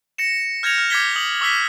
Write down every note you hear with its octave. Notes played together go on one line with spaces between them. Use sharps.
A#6 C#7 E7
F6 G6 G#6 A#6 C#7 F7
F6
D6 G6 G#6 B6 G7
D#6 F#7
C#6 D6 E6 F6 B6 G7